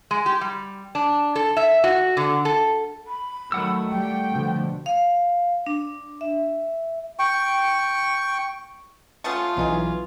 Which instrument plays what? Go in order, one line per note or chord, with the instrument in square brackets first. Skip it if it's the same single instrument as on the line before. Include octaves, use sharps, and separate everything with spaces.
[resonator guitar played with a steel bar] G#3
G4
G3
D4
A4
E5
F#4
D3
A4
[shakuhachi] B5
[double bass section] D#3 F#3 [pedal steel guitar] A3 F#5 E6
[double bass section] G3 [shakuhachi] G5
[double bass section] B2 D3 F3
[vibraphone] F5
D4
E5
[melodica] G5 C#6
[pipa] A3 B3 C#4 [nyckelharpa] F4 [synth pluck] C#6 D#6 A6
[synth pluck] B1 [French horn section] E3 [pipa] C#4 D#4 G#4